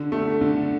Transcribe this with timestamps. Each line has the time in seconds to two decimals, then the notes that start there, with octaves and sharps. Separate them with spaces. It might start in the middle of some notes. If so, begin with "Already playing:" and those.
Already playing: D3
0.12 A3
0.41 D3